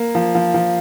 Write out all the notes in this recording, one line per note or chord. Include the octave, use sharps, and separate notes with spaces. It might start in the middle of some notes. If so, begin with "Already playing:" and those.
Already playing: A#3
F3
F3
F3